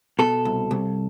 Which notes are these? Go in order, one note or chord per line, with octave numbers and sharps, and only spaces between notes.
B2 A4
C2
C2